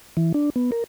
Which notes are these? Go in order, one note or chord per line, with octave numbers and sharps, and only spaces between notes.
E3
D4
B3
A#4